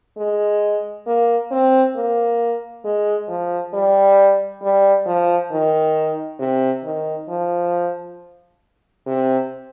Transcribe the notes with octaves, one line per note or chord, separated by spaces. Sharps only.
G#3
A#3
C4
A#3
G#3
F3
G3
G3
F3
D#3
C3
D#3
F3
C3